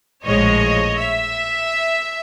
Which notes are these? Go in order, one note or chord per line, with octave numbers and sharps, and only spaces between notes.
A#1 A2 F3 G#3 C#5 D#5
E5